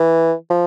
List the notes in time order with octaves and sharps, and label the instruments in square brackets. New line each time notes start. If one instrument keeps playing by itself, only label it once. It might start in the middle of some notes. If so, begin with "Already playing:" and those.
Already playing: [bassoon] E3
F3